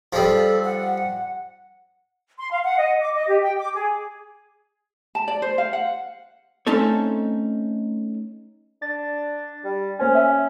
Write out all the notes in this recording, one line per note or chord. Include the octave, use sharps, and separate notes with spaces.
F3 G3 A4
F#5
C6
F5
F#5
D#5
D6
D#5
G4
G5
D6
G#4
A5
D5
C5
F5
F#5
A3 C4 C#4 D#4 A4 C#5
D4 A6
G3
A#3 C#4 C5 G#5
E5 G#5